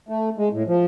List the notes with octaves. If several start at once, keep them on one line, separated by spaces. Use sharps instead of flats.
A3
G#3
A2
F3